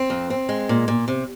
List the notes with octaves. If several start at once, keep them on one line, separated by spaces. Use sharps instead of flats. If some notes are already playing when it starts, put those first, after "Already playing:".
Already playing: C4
F2
C4
G#3
A#2
A#2
C3